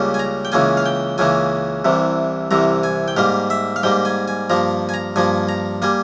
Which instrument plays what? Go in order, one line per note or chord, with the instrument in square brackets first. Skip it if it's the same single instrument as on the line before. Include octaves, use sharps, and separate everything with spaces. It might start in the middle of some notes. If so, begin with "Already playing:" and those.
Already playing: [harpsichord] C#2 C#3 G3 A#3
G#5
A#5
G5
C#2 C#3 E3 A#3 G#5
F5
G5
C#2 C#3 E3 A#3 G#5
C2 C3 E3
C2 C3 E3 A#5
G#5
G5
G#2 G3 A#3 F5
E5
F5
G#2 G3 A#3 G5
G#5
G#5
G2 F3 A#3 A#5
G#5
A#5
G2 F3 A#3 G#5
A#5
G3 A#3 G#5